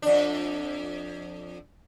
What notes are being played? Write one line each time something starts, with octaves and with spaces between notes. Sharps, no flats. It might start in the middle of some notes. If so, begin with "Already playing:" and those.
F2 D4